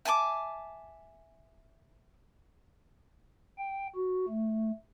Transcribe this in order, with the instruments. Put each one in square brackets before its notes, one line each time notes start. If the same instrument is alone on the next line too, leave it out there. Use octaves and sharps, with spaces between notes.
[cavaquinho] E5 G#5 A5 D6
[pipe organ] G5
F#4
A3